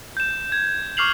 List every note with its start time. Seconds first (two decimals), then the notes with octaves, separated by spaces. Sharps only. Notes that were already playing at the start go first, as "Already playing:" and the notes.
0.17 G6 E7
0.52 G#6
0.97 C#6 D6 F6 C7 F7 F#7